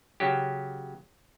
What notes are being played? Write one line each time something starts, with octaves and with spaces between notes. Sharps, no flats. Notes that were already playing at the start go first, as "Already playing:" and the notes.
C#3 F#3 G4